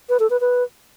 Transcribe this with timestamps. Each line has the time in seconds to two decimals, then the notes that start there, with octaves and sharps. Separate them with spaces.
0.09 B4
0.20 A4
0.30 B4
0.41 B4